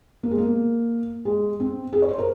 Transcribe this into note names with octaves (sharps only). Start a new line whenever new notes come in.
A#3
G#3
A#3
G#3
C4
G#4
C#5
C5
A#4